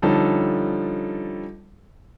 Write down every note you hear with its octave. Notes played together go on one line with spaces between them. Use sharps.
D3 F3 G3 C#4 D#4 A4